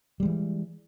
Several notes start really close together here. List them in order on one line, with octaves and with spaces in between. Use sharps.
G3 G#3 E3